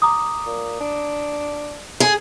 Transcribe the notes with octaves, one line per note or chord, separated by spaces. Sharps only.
A#5 D6 D#6
A#2
D4
G#4